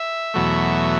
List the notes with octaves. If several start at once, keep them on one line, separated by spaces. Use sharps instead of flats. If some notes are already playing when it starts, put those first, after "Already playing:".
Already playing: E5
E2 B2 F#3 A3